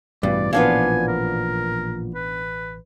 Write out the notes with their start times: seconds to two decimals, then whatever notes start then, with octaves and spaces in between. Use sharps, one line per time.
0.23 A1 G2 B2 E3 D5
0.53 A#2 F3 B3 D4 F5 G#5
1.08 A#4
2.15 B4